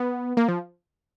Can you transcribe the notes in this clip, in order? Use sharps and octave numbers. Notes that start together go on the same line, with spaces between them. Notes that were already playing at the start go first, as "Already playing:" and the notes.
Already playing: B3
A#3
F3